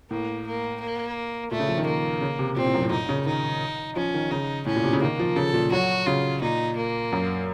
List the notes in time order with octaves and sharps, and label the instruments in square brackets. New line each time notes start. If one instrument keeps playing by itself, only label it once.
[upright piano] A2 [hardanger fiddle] A#3
[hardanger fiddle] A#3
A#3
[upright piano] A#2 [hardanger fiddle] A3
[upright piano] C#3
F3
D#3
[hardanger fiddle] A#3
[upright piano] C#3
C3
[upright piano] A#2 [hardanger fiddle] C4
[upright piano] A2
F#2
A2
[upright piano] A#2 [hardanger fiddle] D#4
[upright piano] C#3
[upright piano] D#3 [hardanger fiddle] D#4
[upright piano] F3 [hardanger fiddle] C#4
[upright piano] D#3
[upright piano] C#3 [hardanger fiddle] D#4
[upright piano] A2 [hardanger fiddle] C#4
[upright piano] A#2
C3
C#3
[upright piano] D#3 [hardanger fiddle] A#3
[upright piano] F3
[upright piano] C#3 [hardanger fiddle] A4
[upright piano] A#2
[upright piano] F#3 [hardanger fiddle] F#4
[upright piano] C#3 [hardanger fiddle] F4
[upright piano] A#2 [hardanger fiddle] D#4
[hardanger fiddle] A#3
[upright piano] F#2